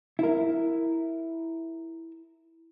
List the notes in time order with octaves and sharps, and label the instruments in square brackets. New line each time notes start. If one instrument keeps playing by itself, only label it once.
[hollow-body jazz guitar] E4 A#4